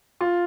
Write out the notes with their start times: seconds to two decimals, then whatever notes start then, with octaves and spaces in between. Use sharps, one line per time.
0.21 F4